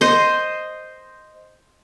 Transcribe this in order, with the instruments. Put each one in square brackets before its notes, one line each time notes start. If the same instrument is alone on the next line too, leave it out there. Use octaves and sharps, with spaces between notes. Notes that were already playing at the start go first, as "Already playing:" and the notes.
[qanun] C5 D#5